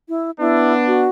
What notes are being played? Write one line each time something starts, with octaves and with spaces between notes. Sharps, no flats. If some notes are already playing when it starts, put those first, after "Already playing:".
E4
B3 D4 E4
F#4